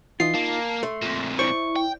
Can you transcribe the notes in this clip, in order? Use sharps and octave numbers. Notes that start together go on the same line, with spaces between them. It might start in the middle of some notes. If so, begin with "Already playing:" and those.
E3 D#4 F4 C7
A#3 A5
A3 C6
F2 A#2
E4 C5 D5 C#6
G5